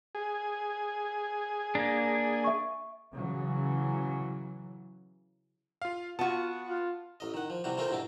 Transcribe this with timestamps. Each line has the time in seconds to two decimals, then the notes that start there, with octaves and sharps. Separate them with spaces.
0.15 G#4
1.75 A#3 D4
2.44 E5 C#6
3.14 C#3 E3 F#3
5.82 F4 F5
6.19 B3 F4 F#4 A5
6.69 F4
7.20 A1 D#5
7.34 D#3 F#5
7.50 F3
7.64 C3 E3 G3 F#4
7.77 E3 A3 C4 F4 A#4 C5
7.91 G2 B2 E4 D6